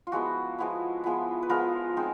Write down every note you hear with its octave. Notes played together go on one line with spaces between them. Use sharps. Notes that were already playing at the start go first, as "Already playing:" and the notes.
F4
F3 G#3 B3 E4 F#4
F3 G#3 B3 E4
F3 G#3 B3 E4
B4
F3 G#3 B3 E4 A#4
G#3 C4 D#4